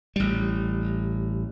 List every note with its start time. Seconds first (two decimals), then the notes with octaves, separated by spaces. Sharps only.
0.16 A1 G3